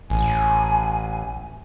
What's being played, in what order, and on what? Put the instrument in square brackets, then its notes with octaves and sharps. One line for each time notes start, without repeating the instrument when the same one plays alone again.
[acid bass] A1 [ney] G#5